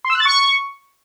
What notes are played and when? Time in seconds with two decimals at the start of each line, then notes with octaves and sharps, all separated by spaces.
0.04 C6
0.10 E6
0.15 F#6
0.20 A6
0.25 C#6